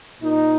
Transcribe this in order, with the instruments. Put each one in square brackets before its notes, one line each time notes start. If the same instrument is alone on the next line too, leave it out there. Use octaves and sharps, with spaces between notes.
[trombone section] A#2 D#4